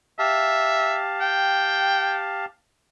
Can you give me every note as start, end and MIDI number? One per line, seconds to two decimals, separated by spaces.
0.19 2.45 67
0.19 0.99 76
0.19 2.45 77
0.19 2.45 81
1.20 2.23 79